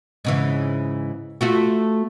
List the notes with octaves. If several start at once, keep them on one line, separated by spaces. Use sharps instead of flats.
G#2 C#3 E3
A3 F4 F#4